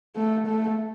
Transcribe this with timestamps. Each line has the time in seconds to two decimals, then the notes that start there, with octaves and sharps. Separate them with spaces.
0.16 A3
0.47 A3